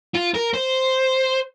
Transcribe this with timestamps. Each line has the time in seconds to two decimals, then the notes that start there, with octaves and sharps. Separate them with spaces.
0.14 F4
0.34 A#4
0.54 C5